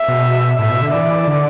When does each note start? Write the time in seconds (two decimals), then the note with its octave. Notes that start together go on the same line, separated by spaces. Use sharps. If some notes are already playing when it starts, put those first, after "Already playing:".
Already playing: E5
0.08 B2
0.59 A2 E5
0.71 B2
0.82 D3
0.93 E3 D5
1.28 D3